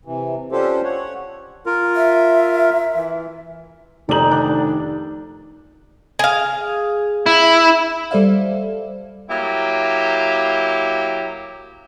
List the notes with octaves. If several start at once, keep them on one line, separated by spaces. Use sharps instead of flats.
C3 E3
C#4 D4 F4 G4 A4 C5
C#5 F#5
F4 A#4
E5
E3
F1 D#3 D#4 D5 F#7
D4
G#4 F5
E4
G3 A4 C5 D5 E5 F5
F#3 A#3 E4 G4